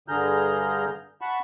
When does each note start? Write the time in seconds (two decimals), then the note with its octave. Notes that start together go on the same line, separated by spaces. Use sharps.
0.08 G2 D3 G#4 A#5 F6 G6
1.21 F#5 A5 B5 C#6